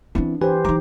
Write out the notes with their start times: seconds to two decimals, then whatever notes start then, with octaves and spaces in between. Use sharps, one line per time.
0.15 E3 B3 C4 D4 E4
0.42 E3 G4 B4 C5 G#5
0.65 E3 D#4 A#5 D6